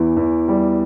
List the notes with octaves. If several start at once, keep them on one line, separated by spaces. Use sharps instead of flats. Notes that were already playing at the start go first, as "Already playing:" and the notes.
Already playing: E2 E3
E2
G3